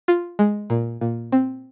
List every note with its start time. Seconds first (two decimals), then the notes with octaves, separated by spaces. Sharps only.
0.08 F4
0.39 G#3
0.70 A#2
1.01 A#2
1.32 C4